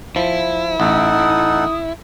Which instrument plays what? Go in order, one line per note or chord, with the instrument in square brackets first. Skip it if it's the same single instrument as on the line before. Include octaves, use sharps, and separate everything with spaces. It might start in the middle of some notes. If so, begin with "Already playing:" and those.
[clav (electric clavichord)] F3 [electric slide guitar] E4
[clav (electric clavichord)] A1 [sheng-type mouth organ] D#4 A4 F#5 [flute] D#6